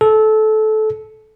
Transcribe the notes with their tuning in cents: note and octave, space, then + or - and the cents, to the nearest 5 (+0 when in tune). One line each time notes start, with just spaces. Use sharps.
A4 -20